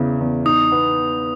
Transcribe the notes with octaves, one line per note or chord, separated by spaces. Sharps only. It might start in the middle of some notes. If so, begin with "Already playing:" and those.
Already playing: E2 C#3 E3
E2
D#4 D#6
B3